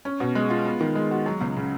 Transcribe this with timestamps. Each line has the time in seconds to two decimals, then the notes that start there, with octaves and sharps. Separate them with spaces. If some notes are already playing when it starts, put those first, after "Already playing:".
0.05 C#4
0.20 B2
0.35 G#3
0.50 F4
0.65 B3
0.81 D#3
0.95 G#3
1.11 F#4
1.26 F#3
1.41 C#2
1.57 C#3